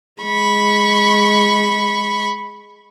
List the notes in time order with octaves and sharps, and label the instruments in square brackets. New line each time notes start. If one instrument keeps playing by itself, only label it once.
[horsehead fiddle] G#3 [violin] B5 C#6